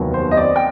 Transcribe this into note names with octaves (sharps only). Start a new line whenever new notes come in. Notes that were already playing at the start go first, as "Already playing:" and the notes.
Already playing: F1 D#2 D#3 F#3 B3
C5
D#5
D5
G5